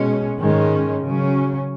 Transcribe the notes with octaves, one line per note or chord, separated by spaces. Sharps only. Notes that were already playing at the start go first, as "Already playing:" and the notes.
Already playing: B2 G#3 C#4
G#2 D#3 G#3 C#4
C#3 F#3 C#4